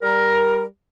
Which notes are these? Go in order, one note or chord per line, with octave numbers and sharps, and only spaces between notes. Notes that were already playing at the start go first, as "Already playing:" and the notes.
G3 A#4